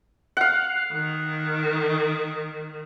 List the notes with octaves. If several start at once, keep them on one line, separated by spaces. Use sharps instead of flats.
F5 F#5
D#3